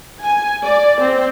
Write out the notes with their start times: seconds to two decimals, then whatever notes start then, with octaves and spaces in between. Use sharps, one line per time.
0.22 G#5
0.63 D5
1.00 C4